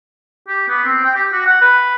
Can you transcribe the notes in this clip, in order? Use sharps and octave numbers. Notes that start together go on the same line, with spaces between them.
G4
B3
C4
G5
G4
F#4
F#5
B4